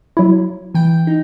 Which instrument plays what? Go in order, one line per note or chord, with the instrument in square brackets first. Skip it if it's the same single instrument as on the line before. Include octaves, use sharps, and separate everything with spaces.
[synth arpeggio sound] F#3 E4
[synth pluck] E3 G5
D#4